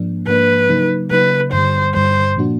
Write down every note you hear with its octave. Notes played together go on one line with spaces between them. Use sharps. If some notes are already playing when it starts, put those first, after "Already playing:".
Already playing: G#2 F3 A#3 D4
G#2 F3 A#3 D4 B4
C#3 F#3 A#3 D#4
C#3 F#3 A#3 D#4 B4
G2 D3 G3 C5
G2 D3 G3 C5
A#2 F3 A#3 D4 F#4